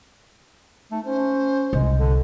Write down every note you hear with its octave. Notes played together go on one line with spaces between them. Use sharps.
A3 D#4
C#4 C5
C2 G#3
D3